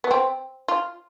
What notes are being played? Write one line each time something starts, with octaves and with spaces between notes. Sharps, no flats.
B3
C4
F4